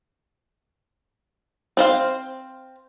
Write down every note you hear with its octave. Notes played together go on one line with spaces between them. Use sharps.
C4 C5 F5